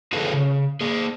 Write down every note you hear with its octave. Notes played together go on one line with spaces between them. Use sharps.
F4 G#4 A4 B4 F5
C#3
A#3 G#4